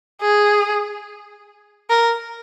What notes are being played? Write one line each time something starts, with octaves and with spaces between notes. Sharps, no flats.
G#4
A#4